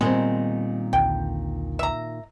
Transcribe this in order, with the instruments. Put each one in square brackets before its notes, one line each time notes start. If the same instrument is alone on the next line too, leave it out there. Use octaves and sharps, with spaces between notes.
[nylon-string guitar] A#2 D#3 C4 [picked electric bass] G3 B3 [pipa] G#3
[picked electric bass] A#1 D#2 D3 [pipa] G5
[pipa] E5 A#5